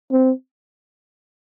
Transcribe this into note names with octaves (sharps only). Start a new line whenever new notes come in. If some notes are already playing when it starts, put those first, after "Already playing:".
C4